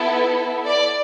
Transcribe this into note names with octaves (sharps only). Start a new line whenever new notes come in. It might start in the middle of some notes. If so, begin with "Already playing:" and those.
Already playing: B3 E4 A4
D5